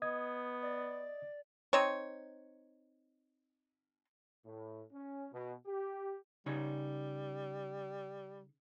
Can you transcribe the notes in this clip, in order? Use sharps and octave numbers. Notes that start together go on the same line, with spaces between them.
B3 D#5 D#6 G#6
D5
C4 D#4 C#5
A2
C#4
B2
G4
C#3 G3 D#4 C#5